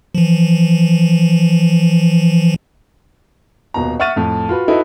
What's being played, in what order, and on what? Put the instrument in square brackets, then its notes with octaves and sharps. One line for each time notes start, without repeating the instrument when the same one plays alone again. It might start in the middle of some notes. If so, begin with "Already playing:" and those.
[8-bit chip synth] E3 F3
[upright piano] D#1 B2 A#5
E5 F#5 C#6 F6 A6 D#7
F2 A2
F4 F#4 B4
D#4 E4 F#4 A4 B4